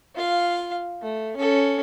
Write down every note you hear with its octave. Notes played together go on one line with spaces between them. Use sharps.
F4 F5
A3
C#4 A4